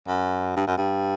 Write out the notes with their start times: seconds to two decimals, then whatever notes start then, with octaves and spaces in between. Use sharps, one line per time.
0.08 F#2
0.56 G2
0.67 F#2
0.78 G2